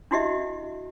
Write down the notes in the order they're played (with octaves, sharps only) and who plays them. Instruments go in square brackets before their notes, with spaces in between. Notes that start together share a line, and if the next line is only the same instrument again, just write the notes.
[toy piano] D4 E4 F#4 G4 D#5 E5